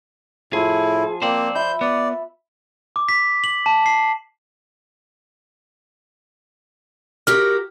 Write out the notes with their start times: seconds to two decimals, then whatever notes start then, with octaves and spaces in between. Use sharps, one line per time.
0.53 A2 F3 E4 G#4
1.22 A#3 C4 C5 D5
1.55 E5 B5 G6
1.81 B3 D5
2.96 D6
3.09 B6
3.44 F#7
3.66 A5
3.86 C7
7.27 F#4 G4 A#4 F6